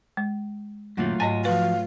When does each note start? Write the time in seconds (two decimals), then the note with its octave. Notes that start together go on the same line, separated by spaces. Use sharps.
0.17 G#3
0.97 F#2 A#2 D#3 F#3 A3 F4
1.20 G#2 D#5 G#5 A6
1.45 F3 F#4 B4 F5